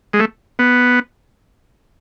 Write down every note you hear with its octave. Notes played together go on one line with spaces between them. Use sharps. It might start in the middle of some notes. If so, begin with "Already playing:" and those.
G#3
A3
B3